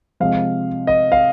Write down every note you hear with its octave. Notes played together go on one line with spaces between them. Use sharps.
C3 F3 G#3 F5
D#5
F5